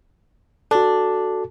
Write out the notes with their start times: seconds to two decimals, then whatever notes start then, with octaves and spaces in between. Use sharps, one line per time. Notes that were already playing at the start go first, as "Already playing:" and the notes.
0.71 D4 F#4 A4